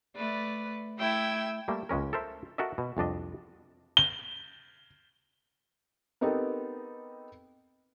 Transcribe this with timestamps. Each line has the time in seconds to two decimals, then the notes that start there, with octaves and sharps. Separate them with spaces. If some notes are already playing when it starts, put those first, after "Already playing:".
0.15 A3 B4 D5
0.98 A3 E4 G5 E6 G#6
1.68 G3 A3 A#3
1.89 C#2 C#3 G#3 C#4 A#4
2.13 A4 A#4 C5 E5
2.58 F#4 A4 A#4 D#5 E5
2.78 B2
2.97 C2 F2 D4 D#5
3.97 G7
6.21 B3 C4 D#4 G4 A4 A#4